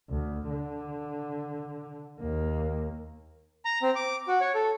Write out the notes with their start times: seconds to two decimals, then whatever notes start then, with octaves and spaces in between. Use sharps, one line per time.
0.10 D2
0.50 D3
2.20 D#2 A#3
3.65 A#5
3.82 C4
3.95 D6
4.28 F#4
4.41 C#5
4.55 A4